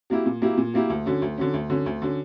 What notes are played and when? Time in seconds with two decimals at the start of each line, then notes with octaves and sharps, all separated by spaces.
0.10 F#3 A#3 E4 G4
0.26 A#2
0.42 F#3 A#3 E4 G4
0.58 A#2
0.74 F#3 A#3 E4 G4
0.90 D2
1.06 D3 F#3 C#4
1.22 D2
1.38 D3 F#3 C#4
1.54 D2
1.70 D3 F#3 C#4
1.86 D2
2.02 D3 F#3 C#4